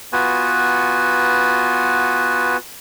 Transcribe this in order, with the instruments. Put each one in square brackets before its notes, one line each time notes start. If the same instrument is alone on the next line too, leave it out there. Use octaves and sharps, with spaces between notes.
[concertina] B3 F4 F#4 B4 G#5